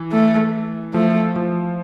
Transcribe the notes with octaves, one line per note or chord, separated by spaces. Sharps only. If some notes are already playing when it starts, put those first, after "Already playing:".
Already playing: E3
A3
F3 A3
F3